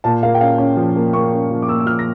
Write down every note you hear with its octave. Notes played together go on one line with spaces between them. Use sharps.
A#2 A5
A#3 F5
G5
C#4 F5
C#4
F3
A#3
A#3 C#6
C#4
F3
D6
A#3 E6
E6
F3 F6
A#6